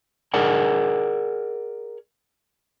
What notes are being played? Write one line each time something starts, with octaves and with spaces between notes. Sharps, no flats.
G#4 A#4 D5 F#5 G#5